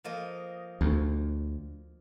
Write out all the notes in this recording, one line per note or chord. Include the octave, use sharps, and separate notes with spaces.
F3 A#3 D#5
D2